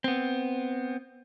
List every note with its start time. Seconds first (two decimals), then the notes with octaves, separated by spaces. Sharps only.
0.04 B3 C4